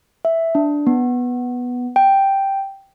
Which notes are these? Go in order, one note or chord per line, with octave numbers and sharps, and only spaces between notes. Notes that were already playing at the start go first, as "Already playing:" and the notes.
E5
D4
B3
G5